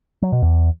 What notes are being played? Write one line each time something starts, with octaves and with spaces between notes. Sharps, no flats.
F#3
B2
E2